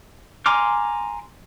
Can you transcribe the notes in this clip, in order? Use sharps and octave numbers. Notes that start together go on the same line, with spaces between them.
G#5 A#5 C6 D6 F6